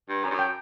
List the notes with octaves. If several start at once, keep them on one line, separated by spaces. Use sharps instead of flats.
G2
F#2 G#5 A#5
G2
F#2 G5 A5